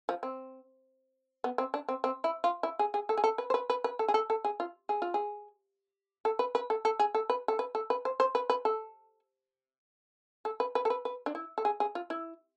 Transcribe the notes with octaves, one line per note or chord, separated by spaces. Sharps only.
F3
C4
B3
C4
D4
C4
C4
E4
F4
E4
G#4
G#4
A4
G#4
A4
B4
C5
B4
B4
B4
A4
G#4
A4
A4
G#4
F4
G#4
F4
G#4
A4
B4
B4
A4
A4
G#4
A4
B4
A4
B4
A4
B4
C5
C5
B4
B4
A4
A4
B4
B4
A4
B4
B4
D4
E4
A4
G#4
G#4
F4
E4